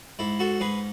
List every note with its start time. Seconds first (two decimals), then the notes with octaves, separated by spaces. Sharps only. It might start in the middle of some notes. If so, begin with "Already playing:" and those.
0.19 G#2 E4
0.39 F#4 A4
0.60 G#2 G#4 B4